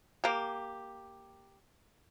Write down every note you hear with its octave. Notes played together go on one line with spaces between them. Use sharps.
A#3 G4